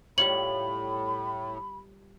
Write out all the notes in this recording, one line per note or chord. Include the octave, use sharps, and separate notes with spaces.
A2 G3 F4 C#5 B5 F#7